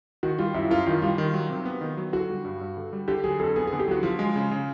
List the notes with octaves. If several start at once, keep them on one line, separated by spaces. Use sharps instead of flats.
D#3 F#4
G3 F4
F#2 E4
F#2 F4
D#3 F4
G3 F4
D#3
F#3
C3
B3
D#3
F#3
D3 F#4
G3
G2
G2
D3
G3
D3 G4
F#3 G#4
F2 A4
B3 G#4
D3 G#4
G4
F#3 F#4
F3 F4
G#3
C#3
C#3